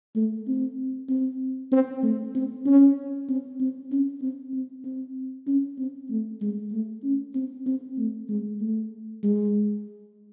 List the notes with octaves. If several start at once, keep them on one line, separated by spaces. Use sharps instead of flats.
A3
C4
C4
C4
A3
C4
C#4
C4
C4
C#4
C4
C4
C4
C#4
C4
A3
G#3
A3
C#4
C4
C4
A3
G#3
A3
G#3